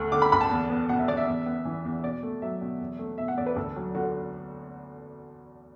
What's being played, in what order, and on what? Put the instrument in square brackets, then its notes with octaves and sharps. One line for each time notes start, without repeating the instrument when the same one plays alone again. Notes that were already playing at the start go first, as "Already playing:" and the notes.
Already playing: [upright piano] D2 A3
D3 D6
B5
D2 B5
A5
E2
B3
B2 F#5
E5
E2 D5
E5
E2
B3
E3
E2
B2 D5
A3
F#3 E5
B2
E2
A3
B2 E5
F#5
E2 D5
B4
D2 A4
F#3
D3 F#4